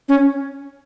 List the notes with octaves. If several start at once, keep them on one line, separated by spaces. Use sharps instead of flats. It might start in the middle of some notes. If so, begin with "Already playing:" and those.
C#4